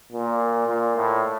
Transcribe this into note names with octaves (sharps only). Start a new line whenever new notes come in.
A#2
A#2
A2